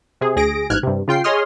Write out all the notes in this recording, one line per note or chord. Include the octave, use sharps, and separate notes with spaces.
C3 G#4
D2 G#4 A#6 D7
A1 G#2 F6 F#6 G#6
G2 C3
C#3 F4 G5 C7
G#4 C#5 D#5 C6 D#6 F6